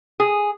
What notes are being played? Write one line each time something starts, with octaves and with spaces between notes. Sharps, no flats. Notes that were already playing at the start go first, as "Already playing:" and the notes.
G#4